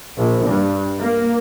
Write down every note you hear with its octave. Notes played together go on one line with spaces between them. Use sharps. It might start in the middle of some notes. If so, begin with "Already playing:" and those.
A#1
G2
A#3